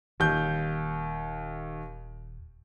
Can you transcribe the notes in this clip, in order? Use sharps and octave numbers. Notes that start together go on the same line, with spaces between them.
D#1 D#2 G6